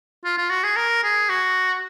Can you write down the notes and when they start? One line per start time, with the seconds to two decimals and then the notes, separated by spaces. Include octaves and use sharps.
0.24 F4
0.38 F4
0.50 F#4
0.63 G#4
0.76 A#4
1.03 G#4
1.29 F#4